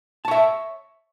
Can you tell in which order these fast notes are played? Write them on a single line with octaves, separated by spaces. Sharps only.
A5 C#5 E5